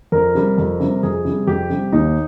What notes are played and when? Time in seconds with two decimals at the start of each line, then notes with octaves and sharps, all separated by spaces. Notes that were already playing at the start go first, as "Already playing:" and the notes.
0.12 F2 A#4
0.35 C3 G3
0.58 F2
0.79 C3 G3
1.03 F2 G#4
1.25 C3 G3
1.47 F2 G4
1.70 C3 G3
1.92 D#2 D#4